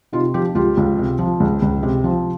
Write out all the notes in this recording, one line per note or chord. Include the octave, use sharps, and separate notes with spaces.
C3 D#4 F4
F3 F4 G4
C#2 F4 G4
C#2
C3
F3
C#2
C#2
C3
F3